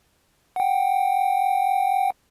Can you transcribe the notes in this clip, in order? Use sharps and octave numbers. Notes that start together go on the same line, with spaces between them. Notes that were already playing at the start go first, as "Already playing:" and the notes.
F#5 G5